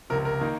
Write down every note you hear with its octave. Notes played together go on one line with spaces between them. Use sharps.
C#2 C3 F3 A#4
A#4
D#3 A#3 D#4